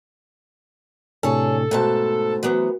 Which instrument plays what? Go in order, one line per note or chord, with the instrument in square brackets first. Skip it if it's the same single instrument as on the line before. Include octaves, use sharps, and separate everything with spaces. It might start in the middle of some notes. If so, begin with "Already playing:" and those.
[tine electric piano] A2 C3 D4 [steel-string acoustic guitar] G#4 C#5 [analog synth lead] A4
[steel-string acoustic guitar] G#2 B2 A5 [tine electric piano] A3 C5
[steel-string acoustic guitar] E3 F#3 B3